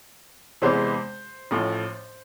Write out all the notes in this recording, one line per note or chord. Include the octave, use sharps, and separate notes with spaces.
E2 C3 E3 G#3 B3 C5
A1 A2 F3